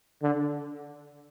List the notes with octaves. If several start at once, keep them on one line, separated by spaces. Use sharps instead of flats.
D3